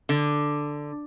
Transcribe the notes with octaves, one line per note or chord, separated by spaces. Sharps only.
D3